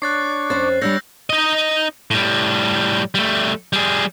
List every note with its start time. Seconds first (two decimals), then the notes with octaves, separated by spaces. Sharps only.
0.02 D4 C#5 F#6 A6 C7
0.50 F2 C#4 C5 A6
0.82 G3 D4 C#5 E6 G6 A#6
1.30 D#4 D#5
2.11 A2 G3
3.15 G3 A3
3.73 G3 G#4